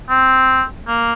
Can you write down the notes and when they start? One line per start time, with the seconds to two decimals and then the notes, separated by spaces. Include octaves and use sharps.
0.09 C4
0.87 A#3